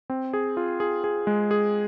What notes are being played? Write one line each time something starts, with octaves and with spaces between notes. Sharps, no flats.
C4
G#4
F4
G#4
G#4
G#3
G#4